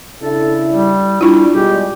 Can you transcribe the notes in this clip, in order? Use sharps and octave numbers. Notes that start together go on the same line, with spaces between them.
C#3 D4 E4 A4
G3
G3 D4 E4 F4
B2 G3 G#3 G4